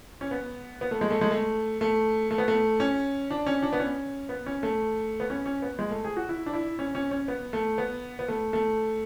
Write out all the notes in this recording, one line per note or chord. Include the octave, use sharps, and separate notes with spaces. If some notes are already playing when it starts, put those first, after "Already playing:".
C#4
B3
B3
A3
G#3
A3
G#3
A3
A3
A3
B3
A3
C#4
D4
C#4
D4
B3
C#4
B3
C#4
A3
B3
C#4
C#4
B3
G#3
A3
G#4
F#4
E4
D4
E4
C#4
C#4
C#4
B3
A3
B3
B3
A3
A3